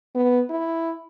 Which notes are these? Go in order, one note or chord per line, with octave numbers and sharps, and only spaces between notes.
B3
E4